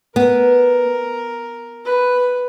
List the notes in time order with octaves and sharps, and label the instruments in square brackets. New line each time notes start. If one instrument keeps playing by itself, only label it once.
[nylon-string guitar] B3 [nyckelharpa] A#4
[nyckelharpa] B4